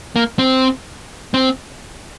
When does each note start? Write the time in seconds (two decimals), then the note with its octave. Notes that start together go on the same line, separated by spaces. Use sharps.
0.16 A#3
0.39 C4
1.34 C4